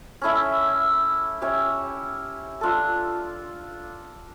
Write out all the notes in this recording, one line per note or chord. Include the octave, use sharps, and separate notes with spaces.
C#4 E4 A4 E5
C#4 G4 C#5 E5
D4 F4 A4